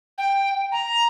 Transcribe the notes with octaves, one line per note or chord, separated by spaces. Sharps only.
G5
A#5